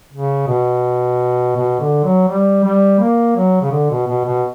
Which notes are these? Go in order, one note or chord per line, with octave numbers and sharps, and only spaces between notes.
C#3
B2
B2
D3
F#3
G3
G3
A#3
F#3
C#3
D3
B2
B2
B2